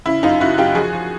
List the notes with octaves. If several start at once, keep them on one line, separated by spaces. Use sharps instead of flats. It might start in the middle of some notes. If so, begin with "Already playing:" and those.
C#3 E4
F#2 D#4 F4
C#3 E4 F#4
F#2 F4 G4
F3 F#4 G#4
F3